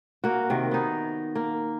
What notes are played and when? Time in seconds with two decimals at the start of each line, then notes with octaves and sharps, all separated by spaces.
0.24 A#3 F#4
0.50 C3 D#3
0.71 B3 D#4
1.35 A#3